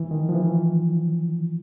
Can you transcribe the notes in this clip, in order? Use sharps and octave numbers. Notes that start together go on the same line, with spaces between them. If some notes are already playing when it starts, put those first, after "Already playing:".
Already playing: E3
D#3
F3
E3